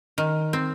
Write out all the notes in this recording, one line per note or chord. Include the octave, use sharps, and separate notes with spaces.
D#3
C4